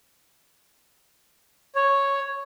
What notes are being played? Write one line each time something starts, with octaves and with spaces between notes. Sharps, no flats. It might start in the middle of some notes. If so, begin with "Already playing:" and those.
C#5